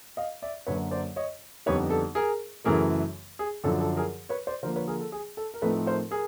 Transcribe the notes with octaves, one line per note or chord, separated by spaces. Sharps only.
D#5 F5
D5 E5
F#2 D3 F#3 A#3 B4 C#5
C5 D5
C#5 D#5
F2 D3 G3 B3 D#4 B4 C#5
A4
G#4 A#4
F#2 C#3 E3 A3 G#4 A#4
G#4
F#2 D3 F3 A4
A4
G#4 A#4
B4 C#5
C5 D5
D3 F3 A#3 A#4 C5
B4 C#5
G#4 A#4
A4
G#4
A4
A#4
A2 F3 A3 C4 D#4 A4 B4
A#4 C5
G#4 A#4